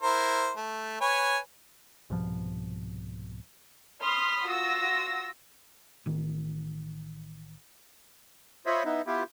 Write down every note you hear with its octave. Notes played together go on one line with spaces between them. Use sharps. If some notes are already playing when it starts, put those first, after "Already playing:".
E4 A#4 C5
A3
B4 C#5 G#5
C2 G#2 B2 F3
B5 C6 D#6 F6 B6 C7
F4 F#4 E6 A#6
A1 D#3
F4 C5 C#5 D#5 E5 B5
B3 D#4 E4
B3 E4 F4 G4